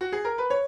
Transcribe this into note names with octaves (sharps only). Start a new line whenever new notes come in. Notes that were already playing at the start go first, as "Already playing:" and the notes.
F#4
G#4
A#4
B4
C#5